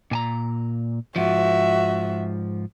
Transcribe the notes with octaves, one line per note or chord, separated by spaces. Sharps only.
A#2 G#5 A#5
G#2 F3 F#4 E5